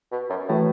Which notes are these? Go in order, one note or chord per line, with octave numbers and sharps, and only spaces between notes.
B2
F#2
A2 E3 A3 F#4 B4